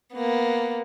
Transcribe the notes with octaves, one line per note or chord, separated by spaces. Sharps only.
A#3 B3